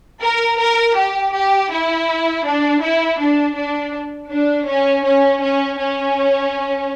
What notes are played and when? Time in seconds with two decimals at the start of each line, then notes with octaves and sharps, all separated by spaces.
0.22 A#4
0.59 A#4
0.96 G4
1.33 G4
1.71 E4
2.45 D4
2.81 E4
3.19 D4
3.56 D4
4.30 D4
4.67 C#4
5.04 C#4
5.41 C#4
5.79 C#4